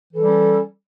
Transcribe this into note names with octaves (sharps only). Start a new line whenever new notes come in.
E3 G3 C#4 A4